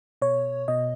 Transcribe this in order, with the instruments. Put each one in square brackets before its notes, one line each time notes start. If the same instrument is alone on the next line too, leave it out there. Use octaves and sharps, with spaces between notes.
[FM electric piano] B2 C#5
B2 D#5